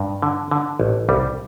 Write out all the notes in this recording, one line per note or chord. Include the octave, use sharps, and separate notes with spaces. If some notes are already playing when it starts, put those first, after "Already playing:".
Already playing: G2
D3
D3
A1
C2 G3